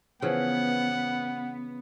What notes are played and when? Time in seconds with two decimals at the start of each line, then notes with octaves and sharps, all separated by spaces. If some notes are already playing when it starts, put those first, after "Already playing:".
0.22 C#3 E3 F3 B3 F#5